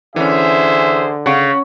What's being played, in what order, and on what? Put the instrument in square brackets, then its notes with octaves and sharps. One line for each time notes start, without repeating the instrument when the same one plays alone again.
[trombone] D3 [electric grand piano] E3 C#4 [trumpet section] G#4 C5 E5
[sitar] C#3 [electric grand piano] F#5 C#6